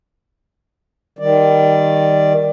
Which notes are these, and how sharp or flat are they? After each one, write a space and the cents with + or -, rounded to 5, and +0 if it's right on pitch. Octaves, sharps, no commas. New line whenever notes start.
D#3 +0 G3 +0 D5 +5